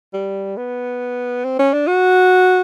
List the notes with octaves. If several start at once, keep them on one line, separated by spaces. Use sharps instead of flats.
G3
B3
C4
C#4
D4
F#4